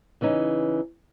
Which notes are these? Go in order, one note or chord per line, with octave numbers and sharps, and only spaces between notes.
C#3 E3 C#4 D#4